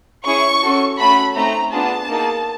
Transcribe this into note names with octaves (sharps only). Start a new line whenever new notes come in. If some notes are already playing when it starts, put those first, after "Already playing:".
C#4 E4 G#4 C#6
C#4 F#4 A4
A3 C#4 F#4 A4 B5
A3 C4 D#4 A#5
B3 D4 F4 G#4 A5
A#3 D#4 G#4